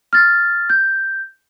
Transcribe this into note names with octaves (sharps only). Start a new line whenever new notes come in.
F6 A6
G6